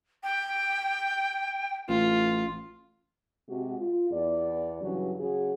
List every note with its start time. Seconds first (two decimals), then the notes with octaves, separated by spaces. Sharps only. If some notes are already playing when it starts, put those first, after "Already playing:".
0.23 G5
1.89 A1 F4
3.49 C3 G#3 F#4
3.78 F4
4.11 E2 D5
4.81 G2 C#3 E3 F#3
5.19 C#3 F#3 F#4 G#4